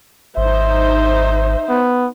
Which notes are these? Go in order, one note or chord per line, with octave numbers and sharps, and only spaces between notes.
G#1 D#4 C5 E5
B3